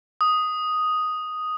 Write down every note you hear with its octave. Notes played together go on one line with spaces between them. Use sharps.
D#6